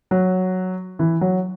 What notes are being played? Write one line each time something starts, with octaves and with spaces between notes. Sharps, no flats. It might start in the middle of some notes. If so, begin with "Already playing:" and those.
F#3
E3
F#3